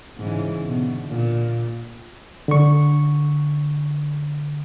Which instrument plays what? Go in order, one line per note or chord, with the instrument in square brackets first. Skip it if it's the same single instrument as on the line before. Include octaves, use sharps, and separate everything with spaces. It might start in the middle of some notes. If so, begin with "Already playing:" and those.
[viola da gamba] G#2 C#3 E3
B2 D3
A#2
[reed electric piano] D3 C#6